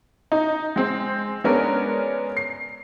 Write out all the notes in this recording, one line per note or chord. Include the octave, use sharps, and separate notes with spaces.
D#4
G#3 C4 C5
G#3 B3 C#4 D4 A#4
C7